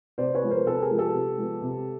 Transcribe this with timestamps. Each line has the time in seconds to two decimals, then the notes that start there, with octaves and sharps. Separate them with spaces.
0.18 C3 C5 D5
0.35 B4 C#5
0.43 F3 G#3 B3
0.50 A#4 C5
0.66 C3 A4 B4
0.82 G#4 A#4
0.91 F3 G#3 B3
0.97 G4 A4
1.15 C3
1.38 F3 G#3 B3
1.62 C3